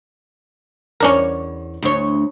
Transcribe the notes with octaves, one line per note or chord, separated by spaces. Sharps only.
E2 C#4 D4 A#4 C#5
D2 C#5